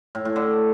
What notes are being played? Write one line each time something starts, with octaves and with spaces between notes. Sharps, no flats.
A2
A2
D3